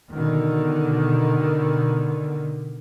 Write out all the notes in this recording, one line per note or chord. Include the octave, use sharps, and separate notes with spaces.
B2 D3 D#3